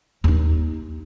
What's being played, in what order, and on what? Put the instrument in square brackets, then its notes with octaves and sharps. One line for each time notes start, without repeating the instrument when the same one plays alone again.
[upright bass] D#2 D#4